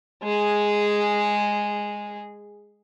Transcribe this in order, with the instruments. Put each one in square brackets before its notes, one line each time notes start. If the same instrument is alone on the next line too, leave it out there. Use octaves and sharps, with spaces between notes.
[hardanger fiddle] G#3 G#4